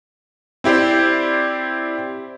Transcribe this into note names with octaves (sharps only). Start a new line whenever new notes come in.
C4 E4 G4 C5 D5